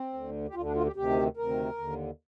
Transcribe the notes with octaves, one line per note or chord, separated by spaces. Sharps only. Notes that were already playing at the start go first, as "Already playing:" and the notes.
Already playing: C4
D2 D3
G4
D2 D3 F4
D4
F4
G4
D2 C3 D#3 G4
D2 C3 D#3 A#4
D#2 D3